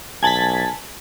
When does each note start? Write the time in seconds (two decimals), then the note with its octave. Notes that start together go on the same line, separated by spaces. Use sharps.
0.23 B1 G#5 A5 G#6 A6 B6 F#7